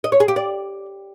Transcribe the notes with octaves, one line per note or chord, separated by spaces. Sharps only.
D#5
C#5
G#4
G4
D5